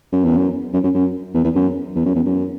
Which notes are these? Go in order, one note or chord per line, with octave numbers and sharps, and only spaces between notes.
F#2
E2
F#2
F#2
F#2
F#2
E2
E2
F#2
E2
F#2
E2
F#2